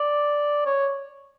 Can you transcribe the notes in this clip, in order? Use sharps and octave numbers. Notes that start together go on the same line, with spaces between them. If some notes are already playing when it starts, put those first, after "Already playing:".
Already playing: D5
C#5